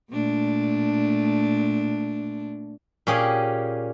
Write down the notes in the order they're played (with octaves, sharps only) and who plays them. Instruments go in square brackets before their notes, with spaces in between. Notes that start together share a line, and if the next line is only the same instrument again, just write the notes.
[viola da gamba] A#2 A3 D4
[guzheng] A#2 C#4 G4 G#4